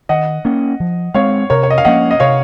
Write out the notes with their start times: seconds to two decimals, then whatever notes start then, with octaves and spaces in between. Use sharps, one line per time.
0.09 D#3 D#5 F#5
0.45 A#3 C#4
0.80 F3
1.14 G#3 C4 C#5 F5
1.50 C3 A#4 C#5
1.63 C#5
1.70 D#5
1.78 F5
1.85 F3 A#3 C#4 D#5 F#5
2.11 D#5
2.20 C3 C#5 F5